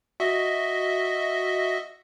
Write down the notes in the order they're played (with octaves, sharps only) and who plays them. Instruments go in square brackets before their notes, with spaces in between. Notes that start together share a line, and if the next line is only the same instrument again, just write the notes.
[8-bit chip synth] F#4 D#5 E5